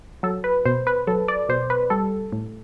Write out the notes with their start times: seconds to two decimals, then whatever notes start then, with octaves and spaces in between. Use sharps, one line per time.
0.23 F#3 A4
0.44 B4
0.65 B2 C5
0.87 B4
1.07 F#3 A4
1.28 D5
1.49 B2 C5
1.70 B4
1.90 G3 A4
2.32 A2